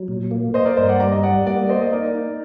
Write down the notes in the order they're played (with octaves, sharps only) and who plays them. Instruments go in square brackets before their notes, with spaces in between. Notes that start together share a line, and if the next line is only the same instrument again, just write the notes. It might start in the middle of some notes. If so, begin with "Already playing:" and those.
Already playing: [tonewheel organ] F#3
A#2
A#3
[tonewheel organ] A#3 [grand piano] C5 D#5
[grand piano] A#4 D5
[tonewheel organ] G2 [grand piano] C5 D#5
[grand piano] D5 F#5
[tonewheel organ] G3 [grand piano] A#5 D6
[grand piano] D#5
[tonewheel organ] G3 [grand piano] D5 F#5
[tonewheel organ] A#3 [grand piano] D5 F#5
[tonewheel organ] A#3 [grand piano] C5 D#5
[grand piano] D#5
[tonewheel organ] D#4 [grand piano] A#4 D5
[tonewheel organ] D#4